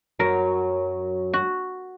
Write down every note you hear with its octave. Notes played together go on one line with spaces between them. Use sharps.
F#2 F#3 A#4
F#4